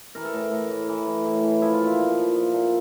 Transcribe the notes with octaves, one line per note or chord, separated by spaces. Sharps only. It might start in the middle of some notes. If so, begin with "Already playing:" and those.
E3 A#4
A4
A2 A#4
A2
E3
E3
A2
A2
E3
F3 E4
F4
A#2
E4
A#2
F3
F3
A#2